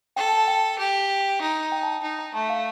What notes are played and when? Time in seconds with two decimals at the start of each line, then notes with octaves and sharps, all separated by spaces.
0.16 A4 G5
0.27 A5
0.37 A5
0.48 G5
0.78 G4
1.41 D#4
1.72 G5
1.83 A5
1.92 A#5
2.03 D#4
2.19 A#5
2.34 A3 A5
2.49 F5